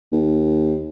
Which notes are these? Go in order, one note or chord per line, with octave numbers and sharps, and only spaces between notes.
D#2